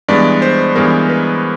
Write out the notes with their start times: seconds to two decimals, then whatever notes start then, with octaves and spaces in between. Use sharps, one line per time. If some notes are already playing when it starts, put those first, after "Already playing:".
0.08 G2 E3 G#3 B3 D5
0.42 C5
0.75 G2 E3 G#3 B3 A#4
1.09 B4